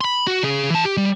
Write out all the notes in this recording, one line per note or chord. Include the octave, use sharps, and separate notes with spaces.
B5 C6
F#4
C#3 G#4
E3 A5
G4
G3